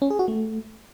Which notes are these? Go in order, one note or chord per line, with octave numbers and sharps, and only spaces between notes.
C#4
G#4
F#4
A3